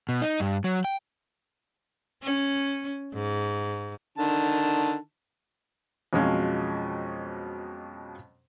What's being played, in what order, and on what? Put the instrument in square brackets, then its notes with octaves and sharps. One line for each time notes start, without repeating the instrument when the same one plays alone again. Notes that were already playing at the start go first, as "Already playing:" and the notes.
[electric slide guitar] B2
D#4
G2
F#3
G5
[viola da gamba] C#4
G#2
[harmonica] D3 D#3 A5
[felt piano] F2 B2 F3 F#3 G#3 C#4